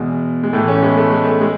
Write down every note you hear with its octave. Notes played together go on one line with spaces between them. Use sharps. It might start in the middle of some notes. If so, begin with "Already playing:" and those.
Already playing: E2 B2 G#3
G#3
A2 E3 A3
A3 C#4
G#3 B3
A3
G#3
A3
G#3